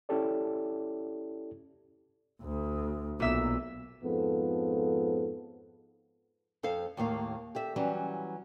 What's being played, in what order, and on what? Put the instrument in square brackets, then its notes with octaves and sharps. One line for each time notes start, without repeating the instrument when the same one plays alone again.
[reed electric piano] C#4 E4 G4 A4 D5
[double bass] D2
[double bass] B1 [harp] A#2 E5 E6
[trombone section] F2 G#2 F3 B3 A4
[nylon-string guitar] F2 A4 C5 F5
D#2 A2 A#3 F5
G4 A4 E5
E3 F#3 G3 C#4